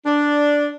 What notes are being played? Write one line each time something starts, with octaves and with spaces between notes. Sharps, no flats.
D4